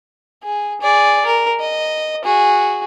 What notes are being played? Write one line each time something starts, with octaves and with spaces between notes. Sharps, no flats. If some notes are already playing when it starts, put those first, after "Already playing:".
G#4
G#4 D5
A#4
D#5
F#4 G#4